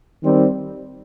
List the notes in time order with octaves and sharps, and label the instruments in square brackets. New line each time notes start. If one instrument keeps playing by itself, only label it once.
[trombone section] D#3 G3 C4